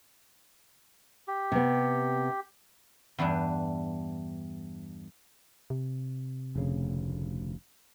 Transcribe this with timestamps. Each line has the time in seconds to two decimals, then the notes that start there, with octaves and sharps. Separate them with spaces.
1.28 G4
1.52 C3 B3
3.18 E2 G2 E3 D4
5.70 C3
6.56 F1 D2 C#3